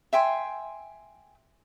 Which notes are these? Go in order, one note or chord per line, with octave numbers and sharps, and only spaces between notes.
E5 G5 G#5 C6